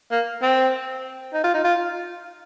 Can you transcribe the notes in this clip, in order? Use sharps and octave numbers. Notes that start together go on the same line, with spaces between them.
A#3
C4
D#4
F4
D#4
F4